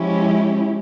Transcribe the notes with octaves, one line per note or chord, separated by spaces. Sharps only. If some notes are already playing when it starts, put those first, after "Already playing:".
Already playing: F3 G#3 C#4 E4 G4